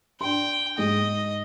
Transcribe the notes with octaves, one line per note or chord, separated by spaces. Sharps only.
D4 G5 C6
G#2 G#3 D#5